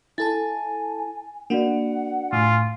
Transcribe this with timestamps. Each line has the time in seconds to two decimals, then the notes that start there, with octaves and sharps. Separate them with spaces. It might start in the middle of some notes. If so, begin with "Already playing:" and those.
0.18 E4 A4 G#5 A5 A6
1.50 A#3 D4 F#4 D5 F#5
2.32 A2 F4 G#5